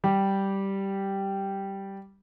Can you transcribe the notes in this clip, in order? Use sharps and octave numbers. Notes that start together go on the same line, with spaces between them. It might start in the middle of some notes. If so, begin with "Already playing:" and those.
G3 G4